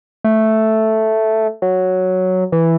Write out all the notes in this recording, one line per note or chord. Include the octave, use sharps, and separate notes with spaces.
A3
F#3
E3